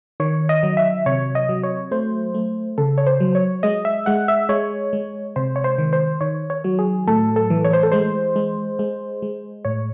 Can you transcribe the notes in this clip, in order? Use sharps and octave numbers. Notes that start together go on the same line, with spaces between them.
D#3 C#5
D#5
F#3
E5
C3 C#5
D#5
F#3
C#5
A3 C5
A3
C#3 A4
C#5
C5
F#3
C#5
G#3 D#5
E5
G#3 F#5
E5
G#3 C#5
G#3
C3 C5
C#5
C5
D#3
C5
D#3 C#5
C#5
F#3
G#4
A2 A4
A4
E3
C#5
C5
A4
G#3 C5
G#3
G#3
G#3
A2 C#5